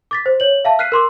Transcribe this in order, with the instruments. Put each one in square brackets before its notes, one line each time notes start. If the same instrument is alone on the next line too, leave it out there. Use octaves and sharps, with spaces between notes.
[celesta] D6 A6 B6
C5
C#5 F#7
E5 F5 A5
F6 F#6 B6 C7 D#7
A#4 C6 D6